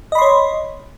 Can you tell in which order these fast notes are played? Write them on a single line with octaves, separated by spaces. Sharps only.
D#5 B5 C6 C#5